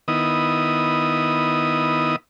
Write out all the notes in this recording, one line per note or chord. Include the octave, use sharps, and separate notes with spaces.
D#3 B3 E4 D#6